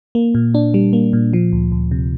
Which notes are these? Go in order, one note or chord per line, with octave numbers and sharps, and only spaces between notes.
A#3
A#2
D4
G3
A#3
A#2
F3
D2
D2
C3